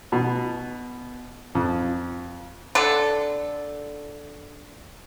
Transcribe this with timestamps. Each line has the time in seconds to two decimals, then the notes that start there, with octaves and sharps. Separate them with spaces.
0.12 B2
1.55 F2
2.75 D3 A4